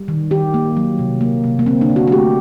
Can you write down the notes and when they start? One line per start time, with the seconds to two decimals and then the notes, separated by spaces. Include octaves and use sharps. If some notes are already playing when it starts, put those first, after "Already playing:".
Already playing: G3
0.08 D#3
0.31 D#3 G4
0.54 A#3
0.77 F#3
0.99 C3
1.21 A#3
1.44 C3
1.59 A#3
1.66 D3 C4
1.81 D4
1.90 D3
1.96 F#4
2.08 F#4
2.12 A3 G4